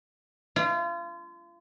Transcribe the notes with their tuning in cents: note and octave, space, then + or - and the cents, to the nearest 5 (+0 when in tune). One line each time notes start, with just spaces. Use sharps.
F4 -35 F5 +0